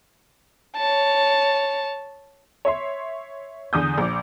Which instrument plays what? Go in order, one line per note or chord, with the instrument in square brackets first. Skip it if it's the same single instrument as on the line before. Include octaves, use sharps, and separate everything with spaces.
[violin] C#5 A5
[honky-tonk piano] C#5 E5 C6
E2 D3 D#6 G6
A#1 D6